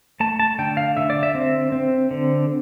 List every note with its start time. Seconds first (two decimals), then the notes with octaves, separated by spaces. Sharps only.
0.20 A3 A5
0.39 A5
0.59 D3 G5
0.77 F5
0.97 D3 E5
1.10 D5
1.23 E5
1.35 C4
1.72 C4
2.11 D3